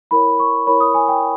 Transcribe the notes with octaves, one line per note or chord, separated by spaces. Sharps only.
E4 A#4 C#5 B5
C#6
E4 A#4 C#5 B5
D#6
G#5
G5